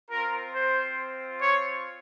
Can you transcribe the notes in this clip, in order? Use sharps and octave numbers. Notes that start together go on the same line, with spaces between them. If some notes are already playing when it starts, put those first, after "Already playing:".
C4 F4 A#4
C5
C#5